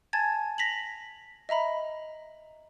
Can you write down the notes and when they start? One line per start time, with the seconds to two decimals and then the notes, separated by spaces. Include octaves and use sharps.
0.13 G#5 A5 G#6 A6
0.58 A#6 B6 F7 F#7
1.49 D#5 E5 A#5 B5